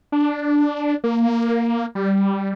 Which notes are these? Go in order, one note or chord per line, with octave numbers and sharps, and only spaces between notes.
D4
A#3
G3